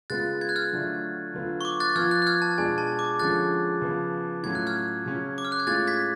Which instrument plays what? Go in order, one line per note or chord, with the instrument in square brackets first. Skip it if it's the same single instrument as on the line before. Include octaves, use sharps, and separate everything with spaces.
[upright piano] C#3 G#3 B3 F4 [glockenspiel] F#6 A6
[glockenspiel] G#6
F#6
F6 G#6
[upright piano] D3 F#3 A3 D4 F4
D3 F#3 B3 F4
[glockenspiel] C#6
D6
F#6 A6
[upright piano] F3 B3 F4 [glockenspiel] F6 G#6
[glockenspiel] F#6 A6
F#6
F6 G#6
A5
[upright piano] B2 G#3 D4 F4 [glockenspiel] G#5
[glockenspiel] A5
D6
[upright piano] D3 F3 G#3 C#4 F4 [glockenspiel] F#6 A6
[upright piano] C#3 F3 B3
[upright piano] A2 F#3 C#4 F4 [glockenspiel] G#6
[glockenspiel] F#6
F6 G#6
[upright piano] C#3 F#3 C#4
[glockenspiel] D6
F6
F#6
G#6
[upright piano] A2 G#3 C#4 F4 [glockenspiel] F#6 A6
[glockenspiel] G#6 B6